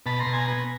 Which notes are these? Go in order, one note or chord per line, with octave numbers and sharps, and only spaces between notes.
B2 A5 B5
A#5 C6
B2
G#5 A#5
B3